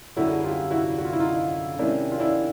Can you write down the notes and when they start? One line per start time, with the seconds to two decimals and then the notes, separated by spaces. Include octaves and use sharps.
0.16 F#2 D3 G3 E4 F#4
0.32 G#4
0.44 F4 G4
0.71 E4 F#4
0.99 F#4
1.05 F4
1.13 E4
1.20 D#4 F4
1.79 C3 D#3 G#3 C#4 D4 E4
2.12 F4
2.20 D4 E4